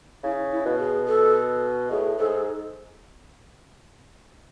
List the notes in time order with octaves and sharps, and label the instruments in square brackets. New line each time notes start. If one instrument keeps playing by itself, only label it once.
[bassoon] C#3 [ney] E4
[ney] E4
[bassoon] B2
[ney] G#4
A4
[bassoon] A2 [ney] G#4
[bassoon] G#2 [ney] A4
[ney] G#4
A4